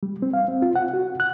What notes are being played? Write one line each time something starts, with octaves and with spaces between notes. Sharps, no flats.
G3
C4
F5
C4
F4
F#5
F#4
F#6